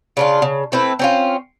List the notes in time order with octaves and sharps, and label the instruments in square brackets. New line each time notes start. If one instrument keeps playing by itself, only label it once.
[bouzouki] C#3 D4 F4
C#3
A3 C4 E4 B4
C4 C#4 F4